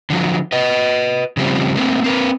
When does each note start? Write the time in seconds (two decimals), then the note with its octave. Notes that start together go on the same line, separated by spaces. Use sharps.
0.10 D3 F3 F#3
0.52 B4 D#5
1.37 C#3 F3 G3 A3 C4
1.75 A3 A#3 C4
2.04 C4 A#4 B4